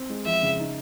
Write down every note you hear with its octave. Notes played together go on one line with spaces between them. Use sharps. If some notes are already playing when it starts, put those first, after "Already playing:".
Already playing: C4
G#3
F3 E5
C#3
D#4